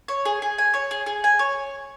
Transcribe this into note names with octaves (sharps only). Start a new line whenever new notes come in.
C#5
G#4
G#4
G#5
C#5
G#4
G#4
G#5
C#5